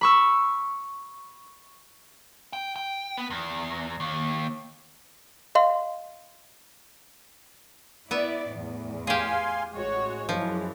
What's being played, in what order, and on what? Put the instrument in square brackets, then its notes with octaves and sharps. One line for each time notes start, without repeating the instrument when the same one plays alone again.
[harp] B5 C#6 E6
[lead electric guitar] G5
G5
B3
E2
D#2
[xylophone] D#5 F5 C6
[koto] B3 E5 [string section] E4 D5
[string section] E2 A2
[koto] G4 G#4 [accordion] F5 G#5 C6
[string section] A1 F#4 C#5 [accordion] G#3
[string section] F#2 E3 [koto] F3